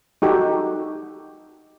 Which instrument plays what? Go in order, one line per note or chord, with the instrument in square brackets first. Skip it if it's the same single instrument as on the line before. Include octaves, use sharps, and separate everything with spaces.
[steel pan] D#4 F#4 G4 A4